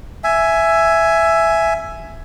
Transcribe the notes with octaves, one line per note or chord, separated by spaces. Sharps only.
E5 G#5